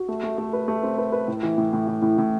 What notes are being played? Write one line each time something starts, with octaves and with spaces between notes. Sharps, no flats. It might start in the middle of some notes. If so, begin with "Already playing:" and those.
Already playing: F#4
A3
A3
A3
B4
A3
C4
B4
B4
A2
E3
A2
A2
A2
A2
A2